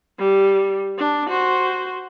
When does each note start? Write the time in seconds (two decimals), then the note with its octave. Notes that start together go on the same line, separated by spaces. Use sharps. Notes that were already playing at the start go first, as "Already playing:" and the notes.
0.18 G3
0.98 D4
1.29 F#4 C5